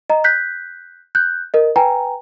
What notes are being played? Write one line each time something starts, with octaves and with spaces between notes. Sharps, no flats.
D#5 A#5
F#6 G6 B6
F#6 G6
A#4 D#5
B4 G5 G#5 A#5